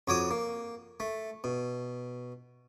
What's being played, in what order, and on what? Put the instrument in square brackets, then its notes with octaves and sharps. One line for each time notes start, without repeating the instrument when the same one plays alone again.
[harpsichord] F2 F#4 C#5 D6 D#6
A#3
A3
B2